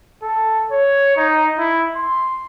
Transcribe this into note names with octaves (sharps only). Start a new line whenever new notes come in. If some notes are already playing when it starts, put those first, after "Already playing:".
A4
C#5
D#4
E4
C6